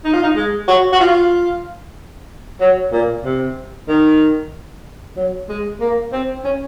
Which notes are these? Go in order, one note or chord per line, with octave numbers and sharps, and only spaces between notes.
D#4
F4
D#4
G#3
F#4
F#4
F4
F#3
A#2
C3
D#3
F#3
G#3
A#3
C4
C#4